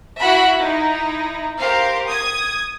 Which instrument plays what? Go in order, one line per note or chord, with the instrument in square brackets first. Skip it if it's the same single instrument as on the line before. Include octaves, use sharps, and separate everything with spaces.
[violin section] E4 F#4 E5 F#5 B5
D#4 E4
G4 A#4 C5 F5
D#6 G#6